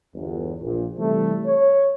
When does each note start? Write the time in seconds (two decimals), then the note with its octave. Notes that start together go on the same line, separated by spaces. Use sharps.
0.14 G1 E2
0.62 A#1 A#2
0.99 C3 E3 G3 A3
1.46 C#5